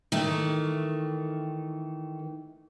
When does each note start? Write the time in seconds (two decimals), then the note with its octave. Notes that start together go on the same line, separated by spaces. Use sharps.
0.12 D#3 E3 A3